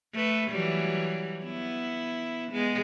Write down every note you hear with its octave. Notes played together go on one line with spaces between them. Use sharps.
A3 B4
E3 F#3 G3
B3 E4
G#3 B3